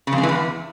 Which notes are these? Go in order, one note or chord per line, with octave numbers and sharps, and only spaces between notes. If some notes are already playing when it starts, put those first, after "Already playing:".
C#3
F2
G#3
E3
E2